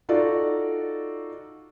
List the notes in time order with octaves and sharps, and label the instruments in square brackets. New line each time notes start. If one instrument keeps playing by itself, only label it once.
[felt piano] D#4 F4 F#4 A4 D5